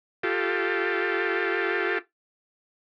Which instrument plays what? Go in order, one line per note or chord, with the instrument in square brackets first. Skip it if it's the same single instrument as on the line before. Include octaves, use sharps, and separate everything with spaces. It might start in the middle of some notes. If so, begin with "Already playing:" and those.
[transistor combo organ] F4 G4 A4